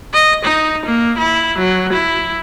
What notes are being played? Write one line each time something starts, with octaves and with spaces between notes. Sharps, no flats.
D#5
D#4
A#3
E4
F#3
E4